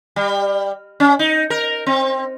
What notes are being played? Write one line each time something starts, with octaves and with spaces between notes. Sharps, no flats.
G3
C#4
D#4
A#4
C4